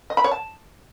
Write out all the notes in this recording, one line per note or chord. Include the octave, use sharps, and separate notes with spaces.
D#5
B5
C#5
A5